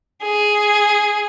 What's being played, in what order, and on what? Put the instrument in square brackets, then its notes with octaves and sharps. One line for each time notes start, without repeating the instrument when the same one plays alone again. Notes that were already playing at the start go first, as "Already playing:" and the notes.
[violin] G#4